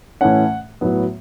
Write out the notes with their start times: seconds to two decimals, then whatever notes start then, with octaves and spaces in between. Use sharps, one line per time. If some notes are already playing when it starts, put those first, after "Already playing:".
0.21 A2 E3 A3 C#4 F#5
0.81 A2 F#3 B3